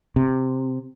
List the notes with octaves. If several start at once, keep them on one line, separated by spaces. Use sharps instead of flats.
C3